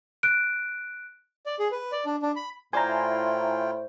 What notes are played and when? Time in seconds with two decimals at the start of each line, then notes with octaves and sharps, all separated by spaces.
0.23 F#6 D7
1.46 D5
1.59 G#4
1.72 B4
1.92 D5
2.06 D4
2.22 D4
2.36 B5
2.73 A2 E4 F4 C5 D5 G5 G#5 A#5